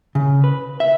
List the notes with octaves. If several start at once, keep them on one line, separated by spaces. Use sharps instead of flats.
C#3
B4
E5